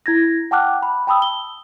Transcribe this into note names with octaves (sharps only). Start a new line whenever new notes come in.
E4 G#6 A#6
F#5 G5 A5 D6 F6 F#6
B5
G5 A5 B5 D#6 E6
G7